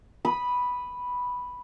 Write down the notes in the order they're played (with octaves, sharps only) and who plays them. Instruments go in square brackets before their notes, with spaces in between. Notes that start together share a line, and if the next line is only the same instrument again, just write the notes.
[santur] B5 D#6